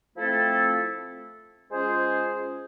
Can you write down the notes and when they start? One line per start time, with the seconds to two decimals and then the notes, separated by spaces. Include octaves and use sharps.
0.16 F3 A3 C4 E4 A4
1.69 G#3 C#4 F4 G#4 C5